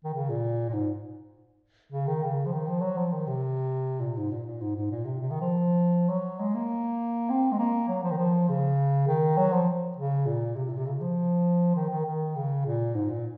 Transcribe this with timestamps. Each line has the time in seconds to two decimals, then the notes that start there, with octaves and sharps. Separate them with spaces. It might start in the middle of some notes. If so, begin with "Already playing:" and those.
0.04 D#3
0.14 C#3
0.30 A#2
0.69 A#2
0.73 G#2
1.92 C#3
2.07 D#3
2.23 C#3
2.46 F3
2.53 D#3
2.68 F3
2.81 F#3
2.97 F3
3.12 D#3
3.27 C3
4.01 A#2
4.17 G#2
4.31 A#2
4.46 A#2
4.61 G#2
4.75 G#2
4.91 A#2
5.05 C3
5.21 C3
5.30 D#3
5.41 F3
6.09 F#3
6.40 G#3
6.55 A#3
7.29 C4
7.52 G#3
7.59 A#3
7.88 F#3
8.03 F3
8.11 D#3
8.18 F3
8.48 C#3
9.07 D#3
9.37 F#3
9.53 F3
9.97 C#3
10.26 A#2
10.56 C3
10.69 A#2
10.78 C3
10.86 C#3
11.00 F3
11.75 D#3
11.90 D#3
12.05 D#3
12.36 C#3
12.65 A#2
12.95 G#2
13.09 A#2